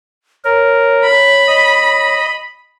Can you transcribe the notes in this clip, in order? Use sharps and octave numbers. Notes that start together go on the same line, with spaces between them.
A#4 C#5
B5
D#5